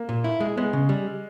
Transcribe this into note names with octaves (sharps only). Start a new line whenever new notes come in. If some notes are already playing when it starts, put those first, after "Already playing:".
Already playing: A#3
A#2
E4
G#3
G#3 B3
C#3
G3